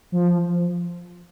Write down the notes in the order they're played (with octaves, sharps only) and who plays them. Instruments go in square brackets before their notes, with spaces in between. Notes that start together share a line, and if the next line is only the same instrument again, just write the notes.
[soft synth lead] F3